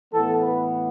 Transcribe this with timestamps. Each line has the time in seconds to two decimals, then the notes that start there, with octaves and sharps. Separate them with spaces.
0.12 A2 E3 B3 A4
0.41 B4